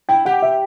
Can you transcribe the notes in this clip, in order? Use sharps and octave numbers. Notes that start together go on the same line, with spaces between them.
E4 G5
G4 F#5
E5